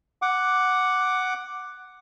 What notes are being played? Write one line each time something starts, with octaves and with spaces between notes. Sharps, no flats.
F#5 D6